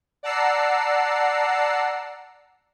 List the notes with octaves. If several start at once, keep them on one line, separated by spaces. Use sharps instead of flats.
D5 F#5 A5 A#5 E6 C7